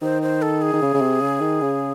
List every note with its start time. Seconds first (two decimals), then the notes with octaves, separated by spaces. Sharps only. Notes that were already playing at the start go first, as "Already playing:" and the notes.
0.02 D#3 C5
0.22 C5
0.42 A4
0.62 G#4
0.73 D#3
0.82 C#3
0.94 C#3
1.01 C3
1.21 C#3
1.41 D#3
1.61 C#3